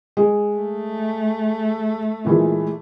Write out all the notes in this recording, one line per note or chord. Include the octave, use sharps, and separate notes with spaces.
G#3
A3
A#2 E3 G#3